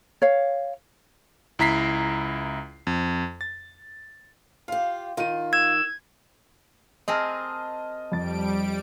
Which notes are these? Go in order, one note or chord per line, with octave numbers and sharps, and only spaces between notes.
C#5 F5
C#2 E4 A#5 B6 C7
F2
A6
F4 G4 F5
D#3 F4 D#7
E6 G#6
C4 G#4 A#4 D#5 A5 F6
F2 G3 A6 D7